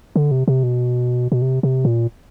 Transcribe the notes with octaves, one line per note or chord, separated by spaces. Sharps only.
D3
C3
C3
B2
B2
C3
C3
A#2